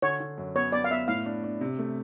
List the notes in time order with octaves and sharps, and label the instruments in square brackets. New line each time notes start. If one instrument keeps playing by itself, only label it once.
[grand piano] D3 [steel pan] C#5
[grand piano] D3
F#2
[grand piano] B3 [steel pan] C#5
[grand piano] B3 [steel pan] D5
[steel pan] F5
[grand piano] B3 [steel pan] E5
[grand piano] A2 [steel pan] F5
[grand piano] D4
D4
C3
A3